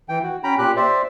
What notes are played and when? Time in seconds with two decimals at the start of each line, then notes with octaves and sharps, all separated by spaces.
0.09 E3 G5
0.23 F#4
0.44 C#4 G5 A#5 B5
0.58 A#2 G4 F#6
0.76 C5 D5 E5